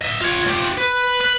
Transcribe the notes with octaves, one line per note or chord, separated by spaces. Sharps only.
D#5 E5
F4 C#5
F4 G4
B4
B4